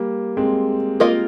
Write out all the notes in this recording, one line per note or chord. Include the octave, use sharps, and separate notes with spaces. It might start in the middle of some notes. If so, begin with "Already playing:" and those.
Already playing: G3 A#3
G#3 C4
A#3 F4 A#4 D#5